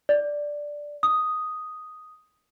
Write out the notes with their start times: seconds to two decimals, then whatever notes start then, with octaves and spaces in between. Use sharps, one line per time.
0.09 D5
1.03 D#6